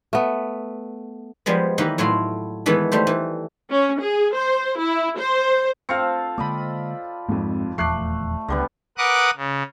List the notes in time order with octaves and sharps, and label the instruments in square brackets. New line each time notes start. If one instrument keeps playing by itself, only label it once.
[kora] A3 B3
[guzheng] F3 G3 G#3 B3
D#3 E3 A#3 D#4 G4 B4
A2 F#3 E4 F4 C6
D#3 E3 G#3 A3 B3
G3 A3 C5
E3
[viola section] C#4
G#4
C5
E4
C5
[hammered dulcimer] C4 F4 A4 [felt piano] F5 F6 C#7
[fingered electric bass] D3 G#3 A#3 [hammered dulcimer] D5 D#5 B5
[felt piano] G#1 F2 [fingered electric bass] G#2
[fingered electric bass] D#1 E2 F3 [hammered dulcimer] A3 [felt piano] D6 F#6 C7
[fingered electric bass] C#2 [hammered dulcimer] D3 G3 B3
[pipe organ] A#4 B4 F#5 D6 D#6 F#6
C#3